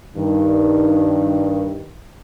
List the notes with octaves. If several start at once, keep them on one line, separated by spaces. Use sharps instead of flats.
G2 D#3